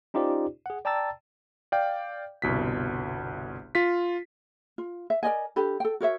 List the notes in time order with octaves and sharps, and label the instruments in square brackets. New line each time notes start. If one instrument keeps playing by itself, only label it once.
[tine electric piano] C#4 D#4 F4 G4 C5 D5
G#4 F#5
D5 G5 A5 A#5 E6 A6
[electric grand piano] D5 F5 G5
G1 C2 B2 B6
F4 B6
[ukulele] F4
E5
A#4 D5 D#5 G#5
D4 G4 A4 B5
A4 G5
F#4 A#4 C#5 E5